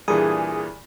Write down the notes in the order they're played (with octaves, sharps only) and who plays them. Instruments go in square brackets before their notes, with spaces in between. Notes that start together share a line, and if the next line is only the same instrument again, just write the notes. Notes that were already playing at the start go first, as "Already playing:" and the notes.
[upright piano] G2 A#2 E3 [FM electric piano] G#4 G#5 D#6